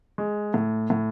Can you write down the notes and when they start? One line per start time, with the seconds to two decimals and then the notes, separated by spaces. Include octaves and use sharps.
0.18 G#3
0.54 A2
0.90 A2